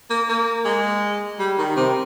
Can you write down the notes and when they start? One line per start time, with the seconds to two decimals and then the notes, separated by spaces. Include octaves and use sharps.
0.10 A#3
0.29 A#3
0.65 G#3
1.39 G3
1.58 D#3
1.76 C3